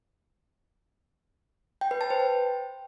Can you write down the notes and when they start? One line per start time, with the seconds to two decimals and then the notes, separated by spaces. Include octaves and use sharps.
1.81 G5
1.91 B4
2.01 A5
2.10 C5
2.20 G5